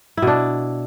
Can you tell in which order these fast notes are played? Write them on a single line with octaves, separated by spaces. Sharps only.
E4 B2 D4